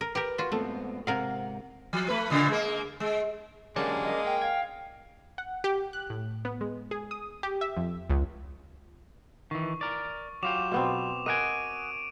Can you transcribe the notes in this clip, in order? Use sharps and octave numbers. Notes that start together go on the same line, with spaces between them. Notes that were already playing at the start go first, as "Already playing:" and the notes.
A#4
G4 A#4 B4
F4 F#4
G#2 A3 B3 C4
G#2 C3 A#4 F5 F#5
F3
A3 B4
A#2 C#3
G#3 A#3
G#3
D3 F#3 G#3 A#3 C#4 G4 D5 A5
D#5
G5
F5 G#6
F#5
G4
F#6
A2
B3
G#3
G#4
D#6
G4
E5
F2
C#2
D#3 E3 C#6
A#4 D5
F#3 F4 G4 D6 E7 F7
B2 B3 C4
A#4 D#5 F#5 G#5 D7 D#7